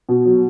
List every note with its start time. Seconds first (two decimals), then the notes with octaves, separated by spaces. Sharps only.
0.09 B2
0.26 F#3